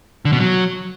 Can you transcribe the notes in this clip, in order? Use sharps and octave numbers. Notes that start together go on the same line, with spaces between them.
D3
B2
F#3